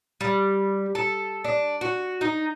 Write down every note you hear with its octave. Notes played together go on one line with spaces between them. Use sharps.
G3
A4
D4
F#4
D#4